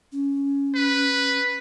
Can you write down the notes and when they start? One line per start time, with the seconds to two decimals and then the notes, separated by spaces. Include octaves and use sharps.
0.12 C#4
0.75 B4